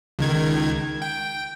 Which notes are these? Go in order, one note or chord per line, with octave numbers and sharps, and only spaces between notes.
C#2 D#3 G#6
G5